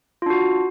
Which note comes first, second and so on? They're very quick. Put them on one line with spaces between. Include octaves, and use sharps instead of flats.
F4 D4 F#4